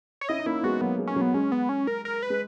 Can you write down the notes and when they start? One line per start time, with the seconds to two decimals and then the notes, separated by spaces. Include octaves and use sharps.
0.21 C#5
0.29 C#4 E4 D#5
0.39 D#4
0.46 A#3 C#4 E4
0.63 G#3 B3 F#4
0.81 F#3 A#3 B3
0.99 G#3
1.07 C#4
1.16 F#3
1.21 B3
1.34 G#3 C#4
1.52 B3
1.69 C#4
1.87 A#4
2.05 A#4
2.23 B4
2.30 G#3